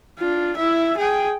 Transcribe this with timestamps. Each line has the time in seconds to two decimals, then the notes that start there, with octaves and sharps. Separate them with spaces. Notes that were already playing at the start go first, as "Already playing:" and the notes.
0.18 D4 F4
0.57 E4 E5
0.97 G#4 G5